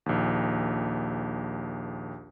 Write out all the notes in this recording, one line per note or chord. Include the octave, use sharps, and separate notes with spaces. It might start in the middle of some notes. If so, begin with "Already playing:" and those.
A#1 D#2